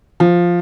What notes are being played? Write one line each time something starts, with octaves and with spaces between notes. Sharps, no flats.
F3